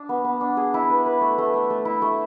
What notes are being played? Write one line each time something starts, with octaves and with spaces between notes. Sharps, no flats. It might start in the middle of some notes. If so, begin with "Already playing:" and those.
Already playing: D4
B3
B3
D4
G#4
E4
B4
B4
A3
A3
A3
A3
E4
A3